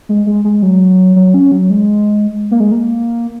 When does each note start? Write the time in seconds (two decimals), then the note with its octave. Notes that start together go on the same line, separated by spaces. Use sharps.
0.09 G#3
0.26 G#3
0.44 G#3
0.62 F#3
1.16 F#3
1.34 C#4
1.51 F#3
1.70 G#3
2.51 A#3
2.60 G#3
2.72 A#3